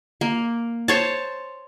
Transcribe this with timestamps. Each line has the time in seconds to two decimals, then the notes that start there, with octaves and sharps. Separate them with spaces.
0.21 A#3
0.88 C5 C#5 A5